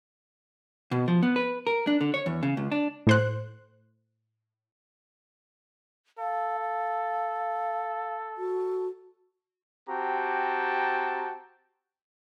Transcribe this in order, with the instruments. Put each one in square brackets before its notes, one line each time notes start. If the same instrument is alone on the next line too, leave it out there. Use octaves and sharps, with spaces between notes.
[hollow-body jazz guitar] B2
F3
B3
B4
A#4
D4
D3
C#5
E2
C#3
C#2
D4
[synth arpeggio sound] A2 C5 F#6
[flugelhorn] A4 [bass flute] F5
[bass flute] F5
F#4
[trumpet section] C4 F#4 G4 G5 A5 A#5